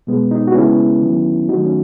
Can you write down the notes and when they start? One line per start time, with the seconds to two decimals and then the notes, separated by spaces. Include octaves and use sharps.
0.07 B2 G#3 B3
0.31 D#4
0.47 F#4
0.54 C#3 G#3 B3 C#4 E4
1.02 D#3 F#3 B3
1.49 D#3 F#3 A3 D#4 F#4
1.65 C#4